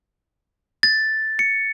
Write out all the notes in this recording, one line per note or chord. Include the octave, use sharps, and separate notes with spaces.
A6
C#7